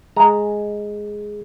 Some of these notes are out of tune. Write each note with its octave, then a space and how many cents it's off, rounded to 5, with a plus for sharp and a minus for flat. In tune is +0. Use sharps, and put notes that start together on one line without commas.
G#3 +0 A#5 +0